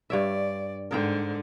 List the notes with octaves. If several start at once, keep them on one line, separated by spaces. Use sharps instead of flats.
G2 C#5 D5 E5
G#2 D3 A#4 C5 G5